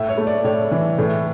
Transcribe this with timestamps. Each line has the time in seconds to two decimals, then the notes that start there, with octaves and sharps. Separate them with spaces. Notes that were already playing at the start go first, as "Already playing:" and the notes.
Already playing: A2 E5
0.09 C#5
0.18 A3
0.27 D5
0.44 A2 C#5
0.72 E3
0.99 A2